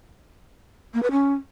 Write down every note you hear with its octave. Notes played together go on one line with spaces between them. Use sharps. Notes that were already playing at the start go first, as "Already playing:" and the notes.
A#3
B4
C#4